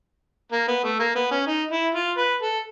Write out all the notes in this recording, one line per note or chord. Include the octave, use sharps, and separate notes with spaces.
A#3
B3
A3
A#3
B3
C#4
D#4
E4
F4
B4
A4